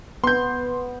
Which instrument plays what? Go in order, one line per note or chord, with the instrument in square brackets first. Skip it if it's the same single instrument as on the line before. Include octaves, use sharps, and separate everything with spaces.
[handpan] B3 [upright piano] C6 G6